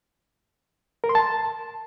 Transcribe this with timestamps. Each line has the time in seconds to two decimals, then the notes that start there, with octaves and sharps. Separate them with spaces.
1.04 A#4
1.09 C6
1.15 A5